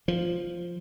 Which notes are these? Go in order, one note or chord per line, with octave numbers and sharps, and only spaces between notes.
F3